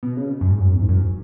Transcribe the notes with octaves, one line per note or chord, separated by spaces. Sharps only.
B2
C#3
F#2
G#2
F#2
E2
G#2
F#2